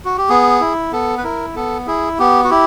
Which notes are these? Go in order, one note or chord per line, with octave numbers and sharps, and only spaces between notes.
F#4
G4
B3 G#4
E4
B3 A4
B4
E4 A#4
B3 A4
E4 G#4
B3 G4
F#4
E4 G4